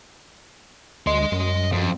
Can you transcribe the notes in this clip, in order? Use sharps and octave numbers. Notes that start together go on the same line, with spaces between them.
D2 D#5 C6
F#2
F2